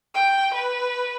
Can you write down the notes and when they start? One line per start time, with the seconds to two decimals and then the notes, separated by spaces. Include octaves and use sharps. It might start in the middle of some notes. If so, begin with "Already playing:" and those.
0.15 G5
0.54 B4